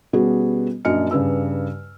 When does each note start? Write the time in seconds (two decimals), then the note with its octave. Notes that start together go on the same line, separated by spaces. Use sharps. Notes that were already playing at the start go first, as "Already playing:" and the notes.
0.13 B2 G3 B3 C#4 F#4 G#4
0.85 A#1 F#2 D4 D#5 F6 C#7
1.11 G2 C#3 B4 E6